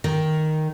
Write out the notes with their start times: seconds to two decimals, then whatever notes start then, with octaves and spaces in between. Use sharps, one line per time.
0.04 D#3